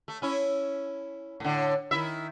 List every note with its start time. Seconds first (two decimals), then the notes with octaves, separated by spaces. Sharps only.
0.08 A3
0.22 C#4 E4
1.40 A2 D3
1.91 D#3 E4 E5